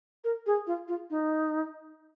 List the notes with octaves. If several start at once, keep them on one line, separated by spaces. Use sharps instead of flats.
A#4
G#4
F4
F4
D#4